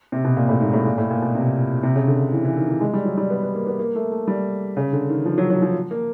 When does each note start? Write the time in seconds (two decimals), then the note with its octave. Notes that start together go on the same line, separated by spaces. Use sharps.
0.12 C3
0.24 B2
0.37 A#2
0.49 A2
0.61 G#2
0.73 A2
0.86 A#2
0.98 A2
1.10 A#2
1.22 B2
1.35 C3
1.83 C3
1.95 C#3
2.07 D3
2.32 E3
2.45 E3
2.57 D#3
2.69 E3
2.81 G#3
2.94 G3
3.05 F#3
3.17 G3
3.30 B3
3.42 B3
3.55 A#3
3.67 B3
3.79 A#3
3.95 A3
4.12 A3
4.28 G3
4.77 C#3
4.93 D3
5.09 D#3
5.25 F3
5.38 F#3
5.50 F#3
5.62 F3
5.91 A#3